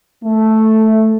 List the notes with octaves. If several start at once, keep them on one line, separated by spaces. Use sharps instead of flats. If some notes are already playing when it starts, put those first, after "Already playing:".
A3